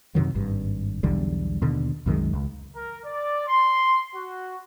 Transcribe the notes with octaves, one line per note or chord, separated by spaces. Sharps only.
F#2 C3 D#3 F#3
G#1 G2
B1 E2 D3 G3
D#2 B2 D3
C2 F#2 D#3 G#3
C#2
A#4
D5
C6
F#4